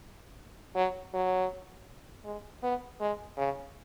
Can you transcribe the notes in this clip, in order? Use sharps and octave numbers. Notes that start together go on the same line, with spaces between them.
F#3
F#3
G#3
B3
G#3
C#3